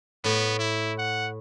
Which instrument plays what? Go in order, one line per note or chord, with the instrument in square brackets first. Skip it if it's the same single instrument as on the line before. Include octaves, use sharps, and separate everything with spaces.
[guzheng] A2 [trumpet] B3
[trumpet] E4
F#5